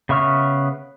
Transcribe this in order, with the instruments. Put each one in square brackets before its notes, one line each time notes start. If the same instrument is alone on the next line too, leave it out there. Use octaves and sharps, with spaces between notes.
[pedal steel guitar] C#3 B3 E5 C#6 F6